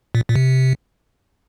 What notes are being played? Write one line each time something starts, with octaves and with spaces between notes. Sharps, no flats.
A#2
A#2
C3